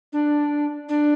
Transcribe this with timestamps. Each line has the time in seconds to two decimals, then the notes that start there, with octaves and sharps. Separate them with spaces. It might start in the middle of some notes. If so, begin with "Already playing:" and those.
0.13 D4
0.89 D4